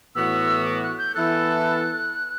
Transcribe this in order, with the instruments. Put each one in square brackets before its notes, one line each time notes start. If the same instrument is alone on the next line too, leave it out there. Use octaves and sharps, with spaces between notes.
[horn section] A2 E3 B3 F#4 [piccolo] E6
[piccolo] D6
F#6
G6
[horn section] E3 B3 E4 A4 [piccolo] F#6